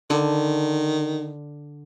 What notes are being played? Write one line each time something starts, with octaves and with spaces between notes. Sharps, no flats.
D3 D#3